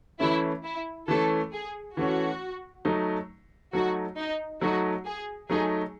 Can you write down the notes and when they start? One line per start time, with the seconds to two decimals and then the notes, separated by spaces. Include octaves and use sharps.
0.20 E3 A3 C#4 E4
0.64 E4
1.08 E3 A3 C#4 A4
1.53 G#4
1.97 E3 A3 C#4 F#4
2.85 F#3 A3 D#4
3.73 F#3 A3 D#4 F#4
4.17 D#4
4.61 F#3 A3 D#4 F#4
5.05 G#4
5.50 F#3 A3 D#4 G#4